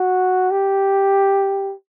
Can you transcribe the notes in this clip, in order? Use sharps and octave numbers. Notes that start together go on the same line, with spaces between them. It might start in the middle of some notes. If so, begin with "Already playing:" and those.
Already playing: F#4
G4